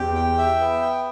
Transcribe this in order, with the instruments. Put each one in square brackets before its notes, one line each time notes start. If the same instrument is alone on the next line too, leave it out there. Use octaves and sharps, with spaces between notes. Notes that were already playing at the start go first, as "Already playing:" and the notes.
Already playing: [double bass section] E2 [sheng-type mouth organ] G4
[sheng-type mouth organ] G5
E5
B3
G5